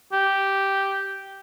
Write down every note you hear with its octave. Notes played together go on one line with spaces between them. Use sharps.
G4